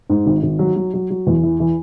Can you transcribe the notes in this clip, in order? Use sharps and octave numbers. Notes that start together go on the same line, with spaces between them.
G#2
G#1
G#1
F#3
F#3
F#3
F#3
E2
E3
E3